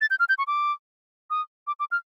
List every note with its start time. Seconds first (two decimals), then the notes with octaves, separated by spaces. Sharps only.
0.01 A6
0.10 G6
0.19 F6
0.29 G6
0.38 C#6
0.47 D6
1.30 D#6
1.67 D6
1.80 D6
1.91 F6